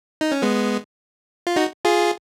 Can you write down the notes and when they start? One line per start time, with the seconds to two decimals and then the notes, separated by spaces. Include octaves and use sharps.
0.21 D#4
0.32 C#4
0.42 G#3 B3
1.47 F4
1.56 D#4 F#4
1.85 F4 G#4